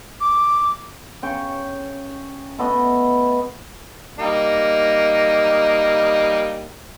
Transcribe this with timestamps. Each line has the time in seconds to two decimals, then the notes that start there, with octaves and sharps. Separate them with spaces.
0.21 D6
1.22 C#3 G5 C#6
2.59 A3 B3 D#5
4.19 G3 A#3 D#4